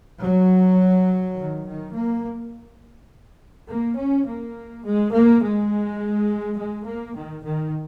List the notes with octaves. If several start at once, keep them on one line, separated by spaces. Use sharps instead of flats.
F#3
D#3
D#3
A#3
A#3
C#4
A#3
G#3
A#3
G#3
G#3
A#3
D#3
D#3